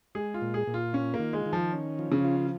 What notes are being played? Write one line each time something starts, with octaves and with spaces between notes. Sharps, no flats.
G#3 G#4
F4
A#2
G#4
A#2
F4
C#4 F4
A#3
D#3
G#3
D#3
F3
C#4
F3
C#3
F4